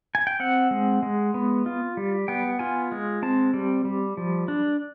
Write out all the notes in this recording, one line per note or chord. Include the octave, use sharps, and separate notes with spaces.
G#5
G5
C4 F#5
G#3
G#3
B3
F4
G3
B3 G5
F4 G#5
G#3
C4 A5
G3
G3
F3
D4